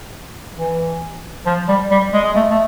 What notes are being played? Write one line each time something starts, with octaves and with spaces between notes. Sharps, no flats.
E3
F3
G3
G3
G#3
G#3
A3
A3